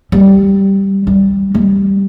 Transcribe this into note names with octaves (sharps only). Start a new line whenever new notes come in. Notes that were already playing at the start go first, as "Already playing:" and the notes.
G3
G3
G3